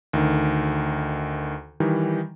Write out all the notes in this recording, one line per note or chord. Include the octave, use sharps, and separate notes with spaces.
D2 D#3
D#3 E3 G3 D#4